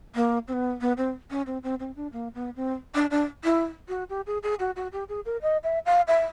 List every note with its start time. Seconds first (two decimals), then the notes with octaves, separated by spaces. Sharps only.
0.15 A#3
0.48 C4
0.53 B3
0.81 B3
0.98 C4
1.31 C#4
1.47 C4
1.63 C4
1.80 C4
1.96 D4
2.13 A#3
2.35 B3
2.56 C4
2.95 D4
3.11 D4
3.44 E4
3.89 F#4
4.10 G4
4.27 G#4
4.43 G#4
4.60 F#4
4.76 F#4
4.92 G4
5.09 G#4
5.26 A#4
5.42 D#5
5.64 E5
5.86 F5
6.07 E5